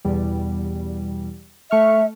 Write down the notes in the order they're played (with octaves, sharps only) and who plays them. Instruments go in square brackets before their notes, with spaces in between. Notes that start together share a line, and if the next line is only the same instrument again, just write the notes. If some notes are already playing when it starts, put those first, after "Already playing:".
[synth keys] E2 B2 G3
[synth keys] A3 C#6 F6 [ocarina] E5